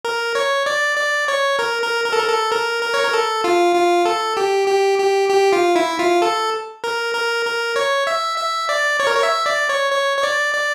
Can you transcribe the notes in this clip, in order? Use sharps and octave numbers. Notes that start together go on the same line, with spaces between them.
A#4
C#5
D5
D5
C#5
A#4
A#4
A#4
A4
A#4
A4
A#4
A#4
C#5
A#4
A4
F4
F4
A4
G4
G4
G4
G4
F4
E4
F4
A4
A#4
A#4
A#4
C#5
E5
E5
D5
C#5
A#4
C#5
E5
D5
C#5
C#5
C#5
D5
D5